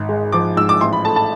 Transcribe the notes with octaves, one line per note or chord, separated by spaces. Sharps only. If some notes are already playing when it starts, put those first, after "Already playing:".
Already playing: G#1
G#3
F3 D6
G#2 E6
D6
A1 C6
B5
A3 A5
A5